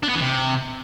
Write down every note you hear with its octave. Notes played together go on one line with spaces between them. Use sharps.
D4
B3
E3
C3